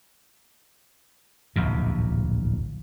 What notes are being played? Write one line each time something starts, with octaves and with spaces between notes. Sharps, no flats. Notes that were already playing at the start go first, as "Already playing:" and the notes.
D1 A#1 E2 C3